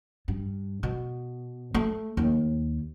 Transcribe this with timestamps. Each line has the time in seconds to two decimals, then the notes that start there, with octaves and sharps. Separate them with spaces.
0.28 G2
0.83 B2
1.74 A3
2.17 D#2